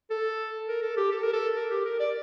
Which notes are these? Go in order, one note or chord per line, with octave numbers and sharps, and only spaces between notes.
A4
A#4
A4
G4
A4
A#4
A4
A#4
G4
A#4
D5